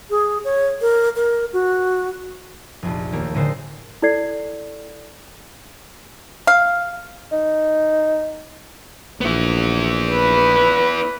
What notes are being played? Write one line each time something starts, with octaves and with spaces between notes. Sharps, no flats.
G#4
C#5
A#4
A#4
F#4
F1 A#1
D#2 A3 A#3
A2 D3 G#3 A3 C5 C7
E4 A4 D5 G#6 C7
F5
D#4
A#1 B3 E4
B4